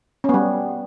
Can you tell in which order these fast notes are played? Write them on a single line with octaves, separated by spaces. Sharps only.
C#4 B3 G3